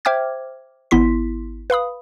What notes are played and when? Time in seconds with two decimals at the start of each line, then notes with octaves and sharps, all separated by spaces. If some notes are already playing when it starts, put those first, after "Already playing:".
0.05 C5 E5 G5 D6 F6 G#6
0.91 G#1 B3 E4 C6 B6
1.70 B4 F5 B5 D#6